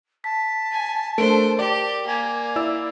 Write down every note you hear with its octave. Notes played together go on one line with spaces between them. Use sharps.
A5 B6
G#5
A3 D4 A#4 C5 D7
G4 D5
A#3 G#5
E4 D5 E6